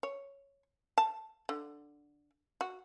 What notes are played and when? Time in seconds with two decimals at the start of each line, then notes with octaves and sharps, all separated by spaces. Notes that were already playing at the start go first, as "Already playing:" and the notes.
0.03 C#5
0.98 A5
1.49 D3
2.61 F#4